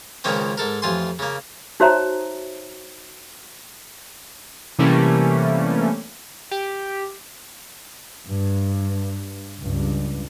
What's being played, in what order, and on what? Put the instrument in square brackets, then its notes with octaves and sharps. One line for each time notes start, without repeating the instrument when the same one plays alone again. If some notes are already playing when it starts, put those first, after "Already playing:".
[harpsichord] C#2 A#2 D#3 A#3 C4 C#4
G#2 A4 A#4
A1 F2 F4 G#5 C6
C#3 A#3
[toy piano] D#4 F#4 C5 C#5 E5 A#5
[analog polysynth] C3 E3 G3 A3 A#3 C#4
G4
[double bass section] G2
C#2 G2